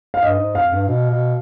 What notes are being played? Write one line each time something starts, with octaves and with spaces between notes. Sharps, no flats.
F5
G2 D#5
G#2
F2 F5
G2
B2
B2